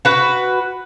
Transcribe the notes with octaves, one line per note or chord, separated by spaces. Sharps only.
F#4 B4